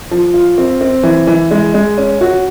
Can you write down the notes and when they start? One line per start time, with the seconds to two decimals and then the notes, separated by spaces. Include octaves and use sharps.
0.11 F3
0.34 F4
0.58 C4
0.81 C4
1.03 E3
1.27 E3
1.51 G#3
1.74 G#3
1.98 C#4
2.21 F#4